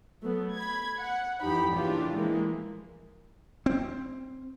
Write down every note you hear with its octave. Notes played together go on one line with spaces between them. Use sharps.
F#3 A3 B3
B5 G#6
F#5
F2 E3 D#4 G4 B5
A#2 C#3 E3 D4 F4 G4
E3 F3 G#3 A#3
C4